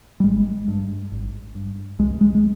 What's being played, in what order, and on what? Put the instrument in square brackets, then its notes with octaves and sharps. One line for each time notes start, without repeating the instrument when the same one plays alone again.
[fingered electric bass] G3
G#1 G#3
G2
G#1
G2
C2 G#3
G#3
G#3